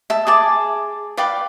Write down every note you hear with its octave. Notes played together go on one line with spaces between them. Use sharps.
E5 A5
G#4 A5 D6
B4 D5 F5 G5